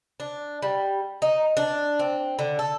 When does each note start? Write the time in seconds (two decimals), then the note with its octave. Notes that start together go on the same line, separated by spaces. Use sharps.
0.20 D4
0.62 G3
1.22 D#4
1.57 D4
1.99 C4
2.39 D3
2.59 A4